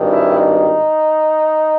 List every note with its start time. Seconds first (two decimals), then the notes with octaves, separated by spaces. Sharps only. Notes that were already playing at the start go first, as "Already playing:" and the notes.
Already playing: G#1 G2 D#3
0.10 E4
0.39 D#4